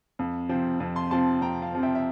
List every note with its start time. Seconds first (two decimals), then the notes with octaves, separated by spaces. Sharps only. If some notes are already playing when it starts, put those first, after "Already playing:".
0.19 F2
0.49 C3 F3 C4
0.80 F2
0.96 A5 C6
1.11 C3 F3 C4 A5 C6
1.41 F2 G5 A#5
1.62 F5 A5
1.72 C3 F3 C4
1.83 E5 G5
1.95 E5